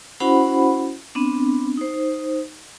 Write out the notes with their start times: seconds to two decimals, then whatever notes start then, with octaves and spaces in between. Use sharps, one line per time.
0.20 C#4 E4 F#4 C5 F#5 B5
1.15 B3 C4 D4
1.77 D#4 C5